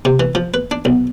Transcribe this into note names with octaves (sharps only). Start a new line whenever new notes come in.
C3
E3
F3
B4
D4
B1